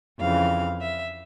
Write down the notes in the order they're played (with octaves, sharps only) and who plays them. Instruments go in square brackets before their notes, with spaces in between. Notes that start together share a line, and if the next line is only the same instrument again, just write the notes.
[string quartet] F2 C#3 E3 F5
E5